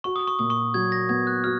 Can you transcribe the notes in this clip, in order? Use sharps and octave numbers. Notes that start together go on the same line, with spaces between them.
F#4 C#6
D#6
C#6
A#2 D#6
C#6
F#3 G#6
A#6
B3 G#6
F#6
F#4 F6